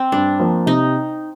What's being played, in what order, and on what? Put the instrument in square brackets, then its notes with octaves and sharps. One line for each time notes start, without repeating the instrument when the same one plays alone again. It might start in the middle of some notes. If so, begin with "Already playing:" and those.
Already playing: [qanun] C4
[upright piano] G2 [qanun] D4
[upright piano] F3 A#3
[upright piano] C3 [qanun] D#4